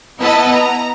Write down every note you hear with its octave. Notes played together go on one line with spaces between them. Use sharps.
B3 E4 B4 D#5 F#5 A5
A#5